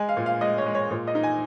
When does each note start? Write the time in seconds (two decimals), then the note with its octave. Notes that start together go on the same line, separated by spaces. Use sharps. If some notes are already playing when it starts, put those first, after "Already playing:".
Already playing: G#3 G#5
0.09 F5
0.17 A#2
0.26 F5
0.41 G#3 D#5
0.58 C#5
0.66 G#3
0.75 C#5
0.91 A#2
1.07 D#5
1.15 D#4
1.23 G#5